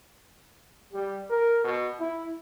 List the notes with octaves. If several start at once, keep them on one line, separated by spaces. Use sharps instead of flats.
G3
A#4
B2
E4